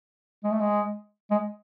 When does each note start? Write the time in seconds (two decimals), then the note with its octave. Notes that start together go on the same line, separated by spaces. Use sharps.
0.44 G#3
0.52 A3
0.60 G#3
1.31 G#3